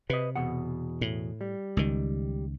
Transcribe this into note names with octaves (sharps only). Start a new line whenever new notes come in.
C3 B4 D#5
E2 B2 F#5
A2
G3
C#2 D#3